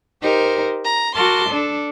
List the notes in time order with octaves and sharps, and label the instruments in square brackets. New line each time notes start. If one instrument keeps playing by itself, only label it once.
[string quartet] D#4 G4 A#4 C5
A#5
F#4 A#4 A5 C6 D6
D4 A4